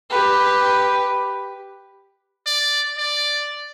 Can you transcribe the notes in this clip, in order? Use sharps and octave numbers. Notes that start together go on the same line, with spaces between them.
G4 B4
D5
D5